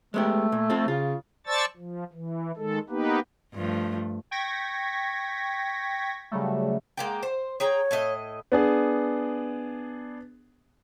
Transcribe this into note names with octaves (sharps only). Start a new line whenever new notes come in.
G#3 A3 B3 G4
A#2
C4 F4 A4
C#3 F4
C5 D5 A5 C#6 E6 A6
F3
E3
D#3 G#3 A4
A#3 B3 D#4 G4 B4
G2 F3 A3
G5 C#6 G#6 A#6 B6
C#3 F#3 G3 A3
G#3 A#3 G5
C5
G#4 C#5 G5 A#5
A2 E4 D#5
B3 D4 G#4